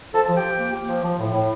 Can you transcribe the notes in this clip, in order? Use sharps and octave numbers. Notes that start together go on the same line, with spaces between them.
F3 A4 A5
F3
G4 G5
F3
A#3
A#3
F3
F3
A2
A2